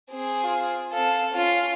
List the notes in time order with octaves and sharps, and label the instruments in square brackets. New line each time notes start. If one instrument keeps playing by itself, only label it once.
[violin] C4 G#4
[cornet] F4
[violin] C4 A4 [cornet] F5
[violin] C#4 F4 [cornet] F5